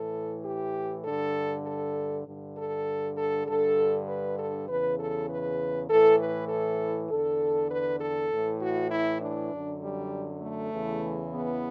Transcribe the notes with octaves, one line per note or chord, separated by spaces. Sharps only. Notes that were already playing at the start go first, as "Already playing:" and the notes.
Already playing: A2 E3 A4
G4
G2 D3 A4
A4
G2 D3
A4
A4
G2 D3 A4
B4
A4
E2 C#3 E3 B4
A4
B4
A2 E3 A4
B4
A4
E2 D3 A4
B4
A4
A2 E3
F#4
E4
D4
F#2 D3
G3
A3
E2 C#3 E3
B3